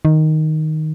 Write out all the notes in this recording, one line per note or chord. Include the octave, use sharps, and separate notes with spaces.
D#3